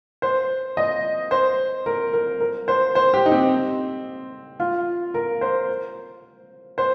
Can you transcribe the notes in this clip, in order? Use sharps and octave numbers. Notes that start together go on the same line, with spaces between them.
C5
D#5
C5
A#4
A#4
A#4
C5
C5
G4
D#4
C4
F4
A#4
C5
C5